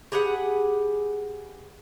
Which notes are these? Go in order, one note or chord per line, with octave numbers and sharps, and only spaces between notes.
G4 G#4 B4 F#5